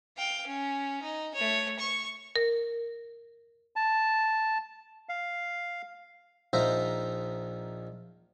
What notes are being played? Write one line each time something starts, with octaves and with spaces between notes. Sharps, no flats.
F5 G5
C#4
D#4
A3 C#5
C#6
A#4
A5
F5
A#1 D#4 F4 C5 E5 A#5